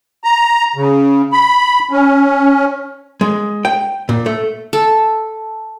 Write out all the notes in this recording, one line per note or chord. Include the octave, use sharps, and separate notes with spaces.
A#5
C#3
B5
C#4
G#3
G5
A#2
A3
A4